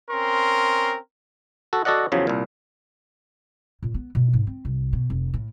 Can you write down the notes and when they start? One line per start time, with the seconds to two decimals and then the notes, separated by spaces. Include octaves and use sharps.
0.11 C4 C#4 A#4 C6
1.73 F#4 A4
1.85 F#4 A4 D5 D#5 F#5
2.12 E2 C#3 F3 F#3
2.27 C2 A#2
3.83 A#2
3.94 B3
4.15 B2
4.33 G#2
4.47 C4
4.65 C2
4.93 B2
5.10 F1
5.34 A2